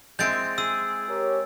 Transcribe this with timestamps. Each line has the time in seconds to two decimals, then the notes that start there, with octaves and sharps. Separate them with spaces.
0.19 G#3 C4 E4 G6 A6 D7
0.58 G#4 E6
1.09 G4 A#4 C#5